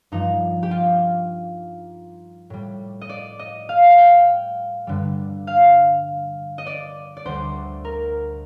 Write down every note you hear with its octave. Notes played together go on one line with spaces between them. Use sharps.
G2 F3 D#4
G4
F4
A2 G3
D#5
D5
D#5
F5
F5
G5
G2 D3 G3
F5
D#5
D5
D5
D2 D3 G3 C5
A#4